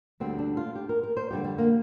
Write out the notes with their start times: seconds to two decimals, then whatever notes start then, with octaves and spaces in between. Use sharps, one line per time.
0.20 D2 D3 G3 C4
0.39 D4
0.57 F4
0.75 G4
0.89 A#4
1.03 A#4
1.17 C5
1.30 F2 D3 G3 G4
1.44 G3
1.58 A#3